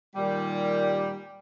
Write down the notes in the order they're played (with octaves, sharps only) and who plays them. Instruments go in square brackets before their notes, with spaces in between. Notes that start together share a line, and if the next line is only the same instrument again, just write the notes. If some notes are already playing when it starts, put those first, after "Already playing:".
[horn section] A#2 D#3 G3